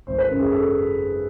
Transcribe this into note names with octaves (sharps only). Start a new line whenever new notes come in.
G#1 C5
B4
F#2 C#3 A#4
G#4
A4